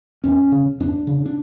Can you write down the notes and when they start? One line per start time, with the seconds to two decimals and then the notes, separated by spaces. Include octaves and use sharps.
0.24 E2 C#4
0.52 C#3
0.80 E2 D4
1.07 C#3
1.26 D4